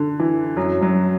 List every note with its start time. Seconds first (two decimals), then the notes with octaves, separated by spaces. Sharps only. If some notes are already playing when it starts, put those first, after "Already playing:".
Already playing: D3
0.20 E3
0.57 F#2 F#3
0.81 F#2 F#3